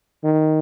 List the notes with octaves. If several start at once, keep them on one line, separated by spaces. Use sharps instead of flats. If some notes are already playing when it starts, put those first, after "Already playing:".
D#3